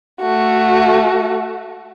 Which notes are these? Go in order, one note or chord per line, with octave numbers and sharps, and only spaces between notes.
A3 F#4